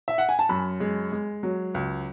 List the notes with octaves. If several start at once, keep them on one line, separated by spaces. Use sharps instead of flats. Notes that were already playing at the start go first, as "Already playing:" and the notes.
E5
F#5
G#5
A5
F#2 B5
G#3
G#3
F#3
C#2